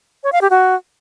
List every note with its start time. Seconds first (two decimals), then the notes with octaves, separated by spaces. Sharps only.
0.24 C#5
0.33 F5
0.41 G4
0.50 F#4